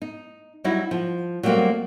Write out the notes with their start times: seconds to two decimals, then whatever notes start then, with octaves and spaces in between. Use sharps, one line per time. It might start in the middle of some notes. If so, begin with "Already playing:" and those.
0.02 D#4
0.64 F#3 G3 D#4 E4 F#4
0.91 F3
1.43 F#3 G3 A3 A#3 C4 F#4